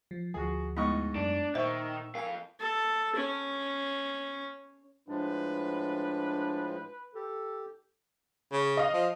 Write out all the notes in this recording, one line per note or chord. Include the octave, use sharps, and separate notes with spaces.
F3
D2 F3 F#4 G#4
G#2 A3 B3 E4 D#5 C#6
F#2 D4
A#2 D#3 C5 E5 C#6
F2 A#4 F5 G#5
A4
C#4
A2 F3 G#3 D4 B4
G4 A4
C#3
D#5 F5
F3